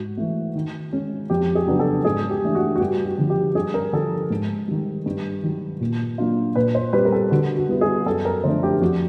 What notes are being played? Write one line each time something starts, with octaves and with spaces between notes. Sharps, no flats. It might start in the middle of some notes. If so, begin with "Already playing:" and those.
Already playing: G#2 F#4
E3 A3
D#3
G#3 C#4
F2 G4
G#4
C#3 F#3 B3 D4
A4
G#2 G#4
G4
E3 A3 D4
F#4
F#4
G2 G4
F#4
D3 F3
G4
G2 G#4
A#4
D3 F3 A4
G#2
D#3 G3
G2
D#3 F#3
A#2
F#3 A#3 D4 F4
A#2 B4
C5
G3 C4 B4
A#4
A4
D3 F#4
F#4
G3 B3 E4
G#4
F#2 A4
A#4
D3 F3 A3 D4 C5
G4
F2 F#4